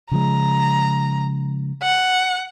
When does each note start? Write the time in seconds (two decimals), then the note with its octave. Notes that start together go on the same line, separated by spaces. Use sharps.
0.12 C#3 F3 G#3 A#5
1.83 F#5